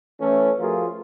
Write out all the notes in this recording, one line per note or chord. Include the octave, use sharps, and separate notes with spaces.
E3 A3 C#4
F3 A3 F4 F#4 G#4 A#4